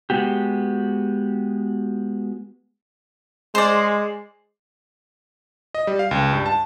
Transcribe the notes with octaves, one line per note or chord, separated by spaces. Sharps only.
G#3 B3 F#4 G4
G#3 C5 D5
D#5
G3
F5
C#2
G2
A5